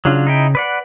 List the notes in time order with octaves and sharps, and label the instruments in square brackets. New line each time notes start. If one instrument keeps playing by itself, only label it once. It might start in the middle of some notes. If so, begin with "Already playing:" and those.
[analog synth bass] C#3 [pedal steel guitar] F#3 D4 F4
[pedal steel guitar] D#4 E4 G5
B4 D5 F#5